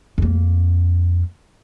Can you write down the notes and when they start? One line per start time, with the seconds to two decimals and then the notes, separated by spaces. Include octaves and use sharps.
0.18 F2 A#3